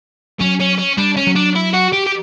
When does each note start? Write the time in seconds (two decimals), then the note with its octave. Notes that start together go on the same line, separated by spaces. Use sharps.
0.40 F#3 C#4
0.60 C#4
0.78 C#4
0.97 G3 D4
1.17 C#4
1.27 F#3
1.35 D4
1.55 E4
1.73 F#4
1.93 G4
2.06 G4